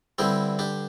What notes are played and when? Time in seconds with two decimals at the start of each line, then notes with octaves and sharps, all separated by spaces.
0.18 G2 D3 G3 C4 E4
0.59 D4 G4